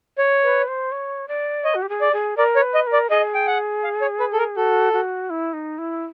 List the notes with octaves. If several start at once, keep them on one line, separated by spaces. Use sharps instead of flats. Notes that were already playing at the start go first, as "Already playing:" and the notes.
C#5
B4
C5
C#5
D5
C#5 D#5
F#4
G4
G#4
D5
G#4
A#4 D5
C#5
B4
D#5
A#4
D5
G#4 D#5
G5
F#5
F5
C#5
B4
A4
A#4
F#4 A4
F#4
E4
D#4
E4